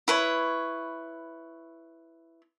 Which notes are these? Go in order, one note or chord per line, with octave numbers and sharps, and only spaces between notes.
E4 B4 C#5